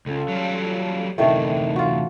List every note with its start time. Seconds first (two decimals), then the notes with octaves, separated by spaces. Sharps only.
0.06 C#2 C#4 F4 A4
0.28 F#3 G3
1.18 D2 A2 C3 D#3 E3 A3 D4
1.76 F4 F#4